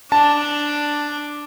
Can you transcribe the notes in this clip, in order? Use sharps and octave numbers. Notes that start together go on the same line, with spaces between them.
D4 A5